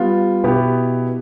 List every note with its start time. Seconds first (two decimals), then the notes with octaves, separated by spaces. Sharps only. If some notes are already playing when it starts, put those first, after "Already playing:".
Already playing: G3 B3 F4
0.44 B2 B3 E4 G4